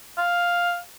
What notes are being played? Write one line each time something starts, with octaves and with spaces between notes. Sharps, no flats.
F5